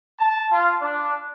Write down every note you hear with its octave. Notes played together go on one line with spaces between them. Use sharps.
A5
F4
D4